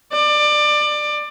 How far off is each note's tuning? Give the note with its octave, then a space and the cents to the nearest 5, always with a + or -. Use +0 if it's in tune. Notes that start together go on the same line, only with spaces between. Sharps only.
D5 +25